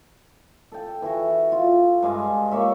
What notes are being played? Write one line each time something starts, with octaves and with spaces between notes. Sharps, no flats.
A4 G5
E3 E4 F#4
F4
G2 G#3 F5 G#5
A#3 C#5 E5